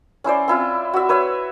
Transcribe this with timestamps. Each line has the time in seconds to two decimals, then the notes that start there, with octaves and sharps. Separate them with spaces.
0.24 C#4 E4 C5 D5
0.48 C4 E4 F4
0.94 F#4 E5
1.09 B4 C#5 E5